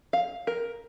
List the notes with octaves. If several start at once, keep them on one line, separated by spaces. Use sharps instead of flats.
F5
A#4